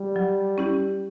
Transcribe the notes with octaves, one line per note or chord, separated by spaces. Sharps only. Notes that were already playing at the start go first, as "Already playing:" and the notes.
Already playing: G3
F#3
C#4 E4 G4